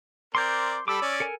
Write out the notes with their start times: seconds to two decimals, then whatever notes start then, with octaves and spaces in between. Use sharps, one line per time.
0.35 C4 A#4 D5 C6 D6 G6
0.88 G3 A4 B5 D6 E6
1.02 C#4 D5
1.20 A4 A#4 G#5